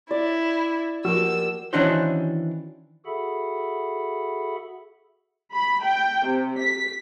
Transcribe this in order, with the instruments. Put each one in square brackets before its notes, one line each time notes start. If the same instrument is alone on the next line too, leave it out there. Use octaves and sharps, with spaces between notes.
[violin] E4 [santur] D5
[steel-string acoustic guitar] F3 A#3 G4 [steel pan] F#4 [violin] E6
[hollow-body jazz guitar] D#3 E3 C#4 D4 F#4 C5
[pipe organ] F#4 G#4 A4 E5 F#5 B5
[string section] B5
G5
C3
B6